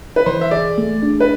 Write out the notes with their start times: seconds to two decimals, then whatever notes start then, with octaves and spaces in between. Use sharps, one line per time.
0.16 B4
0.26 E3 C5
0.41 E5
0.51 G#4 D5
0.78 A3
1.03 D4
1.20 B4